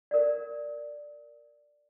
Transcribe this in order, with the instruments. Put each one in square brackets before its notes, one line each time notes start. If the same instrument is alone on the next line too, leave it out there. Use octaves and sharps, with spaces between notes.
[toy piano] A#4 D5